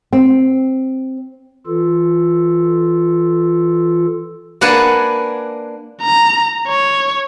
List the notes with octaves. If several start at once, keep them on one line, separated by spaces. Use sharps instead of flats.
C4
E3 F4 A4
A#3 D4 B4 F#5 G#5 A5
A#5
C#5